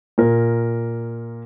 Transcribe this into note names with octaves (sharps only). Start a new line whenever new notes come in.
A#2 A#4